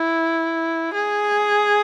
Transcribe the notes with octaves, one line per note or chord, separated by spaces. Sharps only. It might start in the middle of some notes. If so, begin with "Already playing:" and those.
Already playing: E4
G#4